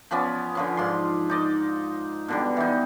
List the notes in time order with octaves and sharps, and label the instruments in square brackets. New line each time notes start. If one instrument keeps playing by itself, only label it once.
[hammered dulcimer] F3 B3 C#4 D5
D3 F3 C#4
G#2 F4 D5 C6
D#4 D5 D#5
B2 D3 G3
E3 D#4